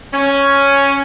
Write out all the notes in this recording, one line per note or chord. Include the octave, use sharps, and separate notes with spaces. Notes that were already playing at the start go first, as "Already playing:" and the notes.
C#4